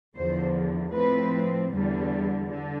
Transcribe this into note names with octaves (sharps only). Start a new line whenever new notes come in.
E2 D3 F3 C5
A2 F3 C4 B4
E2 D3 G3
D3